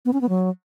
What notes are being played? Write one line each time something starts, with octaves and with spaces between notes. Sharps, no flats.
B3
C#4
B3
F#3